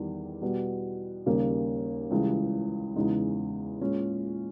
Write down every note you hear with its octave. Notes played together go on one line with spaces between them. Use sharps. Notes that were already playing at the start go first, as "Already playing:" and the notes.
Already playing: E2 D#3 G3
B2 G3 B3
D#2 C#3 G3 A#3
C#2 C#3 E3 G3
E2 C#3 G#3 D#4
A#2 G#3 C#4